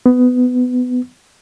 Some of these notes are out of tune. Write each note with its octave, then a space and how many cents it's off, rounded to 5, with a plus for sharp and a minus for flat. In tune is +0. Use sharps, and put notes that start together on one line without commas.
B3 +20